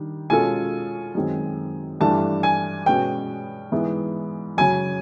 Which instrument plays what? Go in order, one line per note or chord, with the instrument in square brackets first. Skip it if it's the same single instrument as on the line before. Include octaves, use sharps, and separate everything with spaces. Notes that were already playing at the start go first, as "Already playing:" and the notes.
Already playing: [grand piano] D#3 G3 D4
[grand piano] B2 G#3 C#4 F4 A4 [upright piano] G#5
[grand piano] F#2 D#3 G#3 C4
[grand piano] G2 E3 A3 D4 G4 [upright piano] A5
[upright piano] G#5
[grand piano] B2 G#3 C#4 F#4 B4 [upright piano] G5
[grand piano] G#2 E3 G#3 B3 E4
[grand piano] F#2 C#3 F#3 [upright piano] G#5